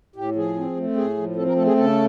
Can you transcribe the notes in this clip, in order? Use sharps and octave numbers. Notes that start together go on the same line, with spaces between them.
A2 G4
F3 G#4
C4
A3
A2 G#4
F3
C4 A4
A#4
A3 A4
G#4
C#3 A4